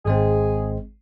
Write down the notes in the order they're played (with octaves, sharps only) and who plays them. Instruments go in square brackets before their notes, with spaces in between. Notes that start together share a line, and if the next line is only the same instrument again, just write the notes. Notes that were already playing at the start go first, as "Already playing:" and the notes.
[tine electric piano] G#1 G#3 C4 [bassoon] G#4